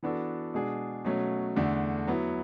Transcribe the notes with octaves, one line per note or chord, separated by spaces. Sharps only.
E3 B3 D4 F#4 A4
B2 G#3 D4 G#4
B2 F#3 A3 C#4
E2 D3 A3 D4
F#3 B3 E4